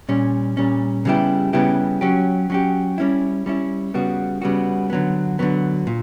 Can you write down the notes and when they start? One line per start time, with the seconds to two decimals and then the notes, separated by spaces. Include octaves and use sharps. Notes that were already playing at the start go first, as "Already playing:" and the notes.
0.09 A#2 G3 C#4
0.57 A#2 G3 C#4
1.05 C#3 G3 B3 E4 G4
1.53 C#3 G3 B3 E4 G4
2.01 F#3 C#4 G4
2.50 F#3 C#4 G4
2.98 G3 C#4 E4
3.46 G3 C#4 E4
3.94 C#3 G3 B3 F#4
4.42 C#3 G3 B3 F#4
4.90 D3 F#3 B3
5.39 D3 F#3 B3
5.87 A#2